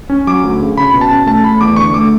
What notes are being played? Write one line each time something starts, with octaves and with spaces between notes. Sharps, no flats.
C#4
F#3 D6
D2
C#3
C#4 B5
B2
A5
C#4
A3 A5
A3 B5
E2 D6
D3 C#6
A3 D6